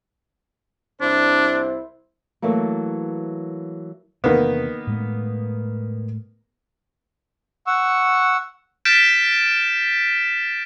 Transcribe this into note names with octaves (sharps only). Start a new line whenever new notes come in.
C2 D4 E4 C5
E3 F#3 A3 A#3
E2 C3 D#3 A#3 B3
A2 G#3 A3
F#5 C#6 E6
F6 G6 A6 B6 D7 E7